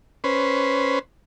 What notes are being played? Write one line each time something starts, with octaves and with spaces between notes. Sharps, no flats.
C#4 B4 C5